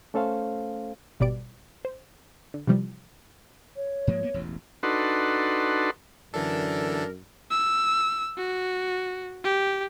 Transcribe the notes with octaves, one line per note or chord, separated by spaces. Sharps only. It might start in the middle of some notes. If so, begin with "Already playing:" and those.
A3 C#4 A4 C5 F5
G#1 B2 G3 D5 D7
C5
D3
C3 E3 F3 G3
C#5
G#2 F3 A#3
A#3 B3
E1 A1 E2
D4 D#4 F#4 A4 B4 C6
F#2 D3 E3 D4 A4 A#4
E6
F#4
G4